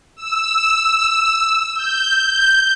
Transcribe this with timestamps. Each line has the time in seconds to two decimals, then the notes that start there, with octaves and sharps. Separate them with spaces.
0.16 E6
1.74 G6